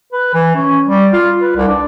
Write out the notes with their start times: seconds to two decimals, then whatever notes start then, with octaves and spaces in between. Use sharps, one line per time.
0.12 B4
0.34 E3
0.55 C#4
0.85 G3
1.13 F4
1.40 B4
1.56 C2
1.68 D4